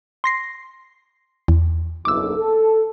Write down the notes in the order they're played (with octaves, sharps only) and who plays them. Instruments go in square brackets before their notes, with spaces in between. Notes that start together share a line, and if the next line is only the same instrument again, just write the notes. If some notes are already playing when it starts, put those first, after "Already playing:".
[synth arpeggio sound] C6 A#6 C7
E2
[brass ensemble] F#1 B1 [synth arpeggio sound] D6 E6
[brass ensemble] A4